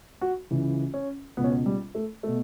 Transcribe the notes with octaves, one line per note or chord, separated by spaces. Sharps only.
F#4
C#2 C#3 E3
C#4
C#2 B2 B3 C#4
B3
G3
A3
B2 A3